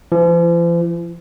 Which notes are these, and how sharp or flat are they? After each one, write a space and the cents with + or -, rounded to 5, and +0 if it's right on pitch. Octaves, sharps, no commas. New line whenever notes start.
F3 -45